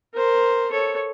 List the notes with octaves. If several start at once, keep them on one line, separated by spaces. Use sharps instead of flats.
A#4 C5
A4 C#5